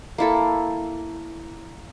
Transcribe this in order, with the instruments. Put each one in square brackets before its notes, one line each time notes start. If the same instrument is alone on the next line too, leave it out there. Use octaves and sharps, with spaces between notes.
[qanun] A#3 E4 A4